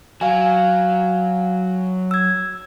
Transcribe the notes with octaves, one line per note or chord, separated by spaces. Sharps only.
F#3 F5 G#5
E6 G#6